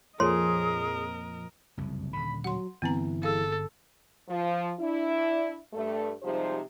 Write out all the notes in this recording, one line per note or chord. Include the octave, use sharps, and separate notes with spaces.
F2 A#2 F3 G#4 A#4 C#5 D#5 C6
F#1 C2 F2
D#1 D3 B5
F#3 F#5 C6
G1 E3 B3 C4 A#5
G#4 A4 F5
F3
D4 E4
G2 A3
C3 F3 G3 G#3 D#4 C5